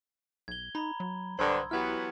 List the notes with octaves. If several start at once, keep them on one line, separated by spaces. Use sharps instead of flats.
B1 G#6 G7
D#4 A#5 B5
F#3
B1 G2 D3 C5 C6 D#6 E6 G#6
E3 F#3 B3 E4 G4 F6 G#6 F#7